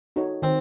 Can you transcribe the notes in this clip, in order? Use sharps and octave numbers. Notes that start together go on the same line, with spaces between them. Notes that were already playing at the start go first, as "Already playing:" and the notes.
D#4 F#4 A4 C#5
D#3 C4